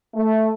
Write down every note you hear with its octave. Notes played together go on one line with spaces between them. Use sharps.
A3